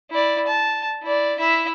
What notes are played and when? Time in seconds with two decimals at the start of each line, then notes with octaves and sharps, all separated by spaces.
0.10 E4 D5
0.47 A5
1.03 E4 D5
1.38 E4 E5